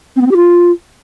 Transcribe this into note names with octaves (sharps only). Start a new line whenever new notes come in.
C4
B3
C4
G4
F4